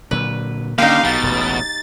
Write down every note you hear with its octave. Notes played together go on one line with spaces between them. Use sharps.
A#2 D3 F#3 B4
D3 A#3 C#4 D#4 G4 F5
B1 B2 A6
E1 A1